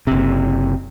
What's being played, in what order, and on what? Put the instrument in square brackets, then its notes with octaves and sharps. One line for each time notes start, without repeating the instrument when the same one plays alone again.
[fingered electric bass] F#1 C3